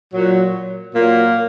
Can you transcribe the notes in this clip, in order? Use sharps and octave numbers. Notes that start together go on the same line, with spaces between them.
A#2 F#3
A#2 F#3 A#3